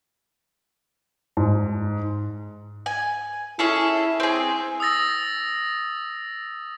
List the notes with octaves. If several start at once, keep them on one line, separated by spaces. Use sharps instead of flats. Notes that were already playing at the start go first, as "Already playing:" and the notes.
G#2
G#5
C#4 E4 G#4 A4
C4 G#4
D#6 E6 A6 A#6